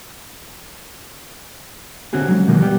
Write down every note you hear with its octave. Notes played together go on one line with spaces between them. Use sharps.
D3 C4 C#4 F#4 G#4
F#3 G#3
B2 D#3 F3 F#3 G#3 A#3
G3 B3 G4